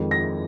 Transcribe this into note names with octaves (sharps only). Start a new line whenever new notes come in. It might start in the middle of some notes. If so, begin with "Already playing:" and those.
Already playing: F2 D#3 G#3
A#6